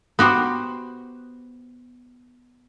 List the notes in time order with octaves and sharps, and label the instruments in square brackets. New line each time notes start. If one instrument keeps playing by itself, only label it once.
[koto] B3 F#4 G4 C5